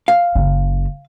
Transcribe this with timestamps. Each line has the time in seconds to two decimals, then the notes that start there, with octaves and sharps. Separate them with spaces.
0.08 F5
0.35 F#1 C#3